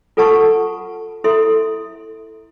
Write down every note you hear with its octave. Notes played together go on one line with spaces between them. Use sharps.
F4 A4 B4 F#5 A5 C#6
E4 A4 E5 C6